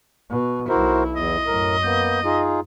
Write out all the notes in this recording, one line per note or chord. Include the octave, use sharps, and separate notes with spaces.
B2
B1 E4 F#4 A#4 C5
E2 D#5
F#2 A2 A#4
A#3 B3 G6
D#4 F4 G#4